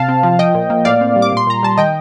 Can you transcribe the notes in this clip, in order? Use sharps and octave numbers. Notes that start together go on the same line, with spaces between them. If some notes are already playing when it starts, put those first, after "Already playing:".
Already playing: C3 F5 A5
C4
F3
F3 D#5 G5
A#2
A#3
A2 D5 F5
C4
G3
D6
A#2 C6
A#2 A#5
G3 A5
D#3 D#5 G5